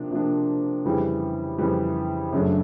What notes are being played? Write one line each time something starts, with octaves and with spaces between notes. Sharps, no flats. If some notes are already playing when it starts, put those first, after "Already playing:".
Already playing: C3 F3 A#3 D4
C3 F3 A#3 D4
F2 C#3 E3 G3
F2 C#3 E3 G3
F#2 C#3 F#3 A3 D4